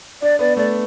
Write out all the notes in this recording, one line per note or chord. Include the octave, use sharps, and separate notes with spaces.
D4 D5
B3 D5
A3 D5